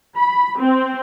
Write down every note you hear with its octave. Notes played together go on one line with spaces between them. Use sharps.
B5
C4